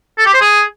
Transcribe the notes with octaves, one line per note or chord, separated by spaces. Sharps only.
A4
G4
C5
G#4